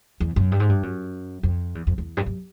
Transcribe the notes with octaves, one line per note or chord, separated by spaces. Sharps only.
E2
F#2
G2
G#2
G2
F#2
F2
E2
F2
E2
G2
F#2